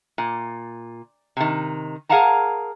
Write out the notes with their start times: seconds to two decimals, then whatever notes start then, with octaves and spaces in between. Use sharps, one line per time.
0.18 A#2
1.37 C3 D#3
2.09 G#4 A#4 F5 F#5 A5 A#5